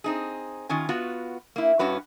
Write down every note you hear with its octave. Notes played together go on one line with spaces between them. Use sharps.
C4 D#4 G#4
D#3 C#4 F4 G#5
B3 F4 F#4
A#3 E4
G2 C#4 F#4 B4